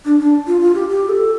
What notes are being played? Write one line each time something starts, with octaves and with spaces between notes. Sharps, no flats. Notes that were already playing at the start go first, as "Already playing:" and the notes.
D4
D4
F4
F4
G4
G4
A4